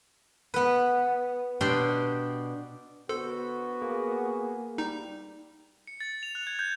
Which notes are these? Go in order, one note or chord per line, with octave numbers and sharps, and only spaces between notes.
B3 B4
B2 D4 G4 C6
D3 B3 F#4 A4 C5
A#3 G#4
G3 D#4
C#7
A6
F7
F#6
G#6
G6